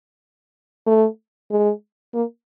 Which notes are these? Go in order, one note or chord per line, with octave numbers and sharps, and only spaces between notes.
A3
G#3
A#3